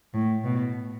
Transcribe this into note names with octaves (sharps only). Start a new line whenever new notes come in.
A2
B2